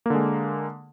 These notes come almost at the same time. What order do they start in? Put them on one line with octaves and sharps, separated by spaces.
A#3 D3 G#3